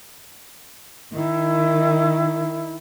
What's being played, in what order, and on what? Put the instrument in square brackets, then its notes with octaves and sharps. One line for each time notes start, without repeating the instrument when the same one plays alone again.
[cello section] D#3 [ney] E4